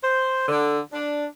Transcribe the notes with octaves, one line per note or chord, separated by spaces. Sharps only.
C5
D3
D4